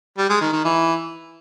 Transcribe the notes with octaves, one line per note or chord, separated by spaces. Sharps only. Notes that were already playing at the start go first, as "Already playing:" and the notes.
G3
G#3
D#3
D#3
E3